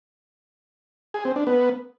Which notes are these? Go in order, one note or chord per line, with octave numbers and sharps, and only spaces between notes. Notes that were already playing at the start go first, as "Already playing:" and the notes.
G#4
C4
D4
B3